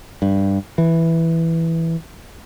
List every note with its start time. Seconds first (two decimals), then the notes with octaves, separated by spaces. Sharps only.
0.22 G2
0.78 E3